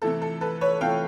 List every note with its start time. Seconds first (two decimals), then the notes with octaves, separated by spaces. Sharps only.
0.02 C3 E3 A3 A4
0.22 A4
0.41 A4 B4
0.61 B4 C#5
0.81 C3 E3 A3 F5 G5